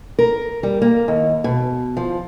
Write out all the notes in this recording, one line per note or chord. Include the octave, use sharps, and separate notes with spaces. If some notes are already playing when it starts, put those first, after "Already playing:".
A#4
G3
A#3
D#2
B2
F3